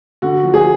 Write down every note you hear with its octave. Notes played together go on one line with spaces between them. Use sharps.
D3 F#4
F3
G#4